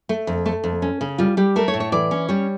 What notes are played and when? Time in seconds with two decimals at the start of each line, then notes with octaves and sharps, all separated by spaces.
0.09 A3
0.27 F2
0.46 A3
0.64 F2
0.82 C#4
1.01 C#3
1.18 G3 F4
1.37 G3 G4
1.56 A3 A#4
1.68 C#5
1.74 A2
1.80 C#5
1.92 E3 D5
2.11 C#4
2.29 G3 C#5